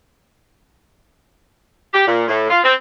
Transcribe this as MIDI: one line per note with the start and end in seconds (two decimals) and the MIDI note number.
1.93 2.07 67
2.08 2.26 46
2.28 2.46 45
2.50 2.60 65
2.64 2.73 60